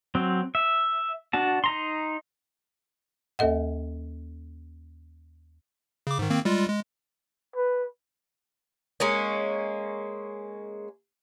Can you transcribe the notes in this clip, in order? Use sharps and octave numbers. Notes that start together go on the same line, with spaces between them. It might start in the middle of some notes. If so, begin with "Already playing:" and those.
F#3 C4
E5
D4 F#4 A5
D#4 A#5 C6
D#2 A#3 A4 D#5 F#5
C#3 D6
G#2 D#3
D#3 A#3 C4
G3 G#3 F4
G#3
B4
G#3 A#3 C#4